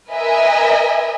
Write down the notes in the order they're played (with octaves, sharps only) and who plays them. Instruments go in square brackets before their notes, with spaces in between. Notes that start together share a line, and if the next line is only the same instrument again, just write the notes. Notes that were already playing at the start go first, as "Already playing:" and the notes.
[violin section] A#4 B4 D#5 E5 G#5